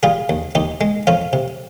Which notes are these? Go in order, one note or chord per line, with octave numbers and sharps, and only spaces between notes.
G3 F4 G#4
D#2
D#2 D#4 G4
G#3
F2 C#4 F4
C3